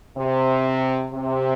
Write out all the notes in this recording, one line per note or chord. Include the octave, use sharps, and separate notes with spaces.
C3
C3